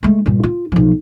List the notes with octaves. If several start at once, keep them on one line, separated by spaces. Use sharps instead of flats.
G#3 A3
A#1 G2
F4
B1 F3